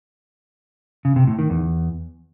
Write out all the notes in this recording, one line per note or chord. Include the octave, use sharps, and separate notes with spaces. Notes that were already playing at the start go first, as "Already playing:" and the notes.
C#3
C3
A2
D#3
E2